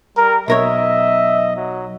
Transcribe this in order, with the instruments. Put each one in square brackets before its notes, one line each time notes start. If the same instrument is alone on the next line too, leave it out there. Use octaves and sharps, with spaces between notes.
[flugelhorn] G3 [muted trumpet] A#4
[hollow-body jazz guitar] B1 A#4 C#5 [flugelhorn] D#5 [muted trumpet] E5
[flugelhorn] F#3